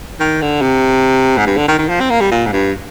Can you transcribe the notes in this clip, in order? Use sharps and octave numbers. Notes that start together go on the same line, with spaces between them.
D#3
D3
C3
G#2
G2
D3
D#3
D#3
F3
C4
A#3
G3
A#2
G#2
G2